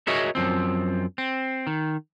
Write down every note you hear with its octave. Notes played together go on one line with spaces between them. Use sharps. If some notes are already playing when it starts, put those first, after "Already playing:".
F#4 G#4 A#4 C#5 D#5 E5
F#2 F3 C4
C4
D#3